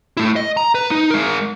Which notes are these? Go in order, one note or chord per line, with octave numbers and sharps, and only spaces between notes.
A3 E4
D#5
A#5
B4
D#4
G#3 A#4